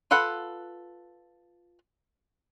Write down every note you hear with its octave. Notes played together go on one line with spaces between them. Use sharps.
F4 A4 B4 F#5